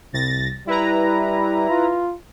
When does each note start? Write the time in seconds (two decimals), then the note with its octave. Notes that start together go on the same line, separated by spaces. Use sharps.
0.13 C2 A6 A#6
0.67 G3 E4 B4 A#5
1.70 F4